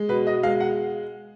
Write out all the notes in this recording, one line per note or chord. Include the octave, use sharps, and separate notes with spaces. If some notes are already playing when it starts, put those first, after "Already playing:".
Already playing: G#3
B2 B4
D#5
G#3 F5
F#5